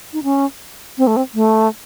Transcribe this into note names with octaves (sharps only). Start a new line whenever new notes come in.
D#4
C#4
C4
A3
C4
A3